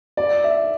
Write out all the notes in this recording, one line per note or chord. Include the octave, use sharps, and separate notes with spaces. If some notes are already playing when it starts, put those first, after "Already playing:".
D5
E5